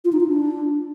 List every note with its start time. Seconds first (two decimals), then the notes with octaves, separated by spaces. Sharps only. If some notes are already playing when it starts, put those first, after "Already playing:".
0.05 F4
0.12 D#4
0.20 F4
0.28 D4